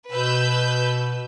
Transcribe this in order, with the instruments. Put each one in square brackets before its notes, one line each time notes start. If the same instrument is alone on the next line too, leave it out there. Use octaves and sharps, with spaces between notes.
[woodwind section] B2 [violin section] B4 E6 G6